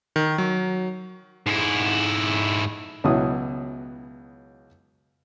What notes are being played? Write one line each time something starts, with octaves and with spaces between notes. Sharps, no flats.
D#3
F#3
G#2 E4
C#2 B2 F#3 E4 D#6